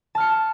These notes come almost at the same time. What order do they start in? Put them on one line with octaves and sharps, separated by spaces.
A5 F6 C#7